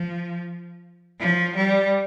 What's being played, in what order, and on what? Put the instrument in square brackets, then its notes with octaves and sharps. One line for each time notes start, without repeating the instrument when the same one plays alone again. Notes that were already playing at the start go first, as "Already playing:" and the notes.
Already playing: [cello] F3
F3
G3